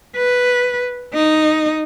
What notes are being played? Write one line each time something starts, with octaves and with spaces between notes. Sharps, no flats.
B4
D#4